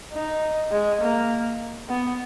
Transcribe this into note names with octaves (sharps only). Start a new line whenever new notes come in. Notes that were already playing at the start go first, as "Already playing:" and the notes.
D#4
G#3
A#3
B3